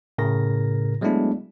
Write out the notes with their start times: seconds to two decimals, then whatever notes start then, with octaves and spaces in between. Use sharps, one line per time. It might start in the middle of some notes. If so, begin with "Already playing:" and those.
0.18 A2 C#3 A#4 A#6
1.01 F#3 G#3 A3 B3 D4 E4